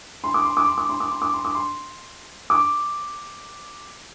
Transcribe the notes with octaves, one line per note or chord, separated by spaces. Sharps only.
C6
D6
C6
D6
C6
D6
C6
D6
C6
D6
C6
D6
C6
D6